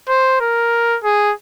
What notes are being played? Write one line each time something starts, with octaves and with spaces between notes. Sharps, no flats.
C5
A#4
G#4